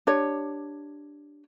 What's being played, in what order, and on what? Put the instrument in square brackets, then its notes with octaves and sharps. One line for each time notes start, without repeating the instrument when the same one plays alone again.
[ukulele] D4 G4 C#5